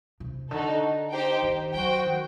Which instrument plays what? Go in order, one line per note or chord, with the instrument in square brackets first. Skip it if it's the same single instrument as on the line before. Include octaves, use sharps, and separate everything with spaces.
[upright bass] C3
[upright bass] D3 [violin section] D#4 F#4 A4
[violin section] D#4 G4 C5 G5
[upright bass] D#3
[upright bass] F#3 [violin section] F#4 C5 G5
[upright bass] D#3